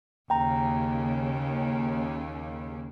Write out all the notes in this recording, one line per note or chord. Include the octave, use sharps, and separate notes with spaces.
D#2 C#3 G5 A#5